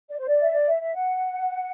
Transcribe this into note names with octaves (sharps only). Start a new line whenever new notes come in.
D5
C5
D5
E5
D5
E5
E5
F#5